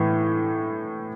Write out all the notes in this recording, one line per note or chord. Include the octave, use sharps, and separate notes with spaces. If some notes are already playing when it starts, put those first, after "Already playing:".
Already playing: A2 E3